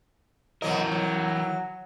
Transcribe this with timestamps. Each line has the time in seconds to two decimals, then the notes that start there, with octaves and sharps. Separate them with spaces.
0.62 B2 E3 F#3 A#4 D#5
0.92 F#3